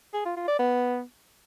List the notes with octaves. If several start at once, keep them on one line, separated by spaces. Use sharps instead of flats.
G#4
F4
F4
D5
B3